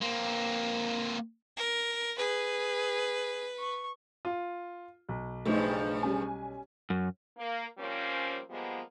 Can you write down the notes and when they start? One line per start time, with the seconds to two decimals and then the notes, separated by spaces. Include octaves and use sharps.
0.01 A#3 C4
1.57 A#4
2.18 G#4 B4
3.59 C#6
4.25 F4
5.09 B1
5.45 G2 C#3 F3 A3 D#4
6.03 G3 C#4 G#5
6.90 F#2
7.37 A#3
7.78 F3 G3 A#3 C4 C#4
8.50 F3 G3 G#3 A#3 B3